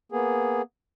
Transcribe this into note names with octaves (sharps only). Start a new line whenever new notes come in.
A#3 B3 G#4